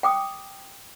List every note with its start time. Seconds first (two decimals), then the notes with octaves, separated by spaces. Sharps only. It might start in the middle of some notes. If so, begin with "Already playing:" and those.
0.03 G5 D6 D#6